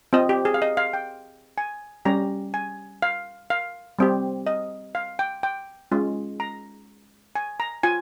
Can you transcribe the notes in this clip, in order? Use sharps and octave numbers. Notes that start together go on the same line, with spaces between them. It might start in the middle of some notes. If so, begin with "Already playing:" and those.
C4 F4 D#5
G4
G#4
F5
D#5
F5
G5
G#5
G3 C#4 G4 A#5
G#5
F5
F5
G3 C4 G4
D#5
F5
G5
G5
G#3 C#4 F4
A#5
G#5
A#5
F4 G#5